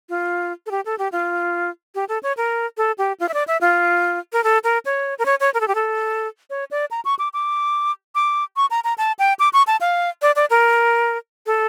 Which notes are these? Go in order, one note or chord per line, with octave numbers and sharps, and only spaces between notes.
F4
A4
G4
A4
G4
F4
G4
A4
C#5
A#4
A4
G4
F4
E5
D5
E5
F4
A#4
A4
A#4
C#5
A#4
C#5
C#5
A#4
A4
G4
A4
C#5
D5
A#5
C#6
D6
D6
D6
C#6
A#5
A#5
A5
G5
D6
C#6
A5
F5
D5
D5
A#4
A4